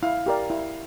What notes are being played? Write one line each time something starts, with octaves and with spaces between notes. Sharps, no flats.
E4 F5
G4 A#4 D5
E4